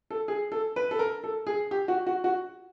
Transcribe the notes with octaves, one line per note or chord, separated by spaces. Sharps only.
A4
G#4
A4
B4
A4
A#4
A4
G#4
G4
F#4
F#4
F#4